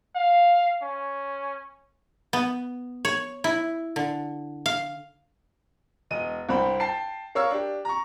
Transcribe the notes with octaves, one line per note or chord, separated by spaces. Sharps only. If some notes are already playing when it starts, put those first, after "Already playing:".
F5
C#4
B3
C#5
E4
D3
F5
E1 D#5 D#7
C2 G2 C5 G5 B5
G5 A5 C7
A#4 C#5 F5 E6
D4 G4
A#5 C#6